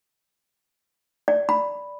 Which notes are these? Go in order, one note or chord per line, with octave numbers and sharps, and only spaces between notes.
D5
B5